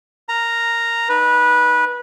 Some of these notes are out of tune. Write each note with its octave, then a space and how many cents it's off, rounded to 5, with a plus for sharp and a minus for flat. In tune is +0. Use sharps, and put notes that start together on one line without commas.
A#4 +0 A#5 -5
D#4 -10 B4 -20